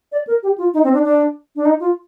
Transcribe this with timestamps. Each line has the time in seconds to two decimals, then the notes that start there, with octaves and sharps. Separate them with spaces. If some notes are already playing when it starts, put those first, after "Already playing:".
0.12 D5
0.27 A#4
0.43 G4
0.58 F4
0.74 D#4
0.84 C4
0.94 D4
1.04 D4
1.56 D4
1.65 D#4
1.80 F4